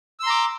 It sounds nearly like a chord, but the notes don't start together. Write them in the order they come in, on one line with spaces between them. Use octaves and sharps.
E6 C6 A#5 D6